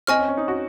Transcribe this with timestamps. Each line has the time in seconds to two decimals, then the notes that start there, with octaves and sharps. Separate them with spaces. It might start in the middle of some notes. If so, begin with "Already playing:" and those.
0.07 C4 D#5 G#5 C#6 F6
0.18 C#4
0.28 C#4
0.37 D#4
0.48 F#4